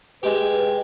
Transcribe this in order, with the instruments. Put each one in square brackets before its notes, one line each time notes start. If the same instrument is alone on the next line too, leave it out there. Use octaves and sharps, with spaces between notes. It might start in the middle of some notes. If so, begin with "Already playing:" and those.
[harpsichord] G#3 G4 [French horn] B4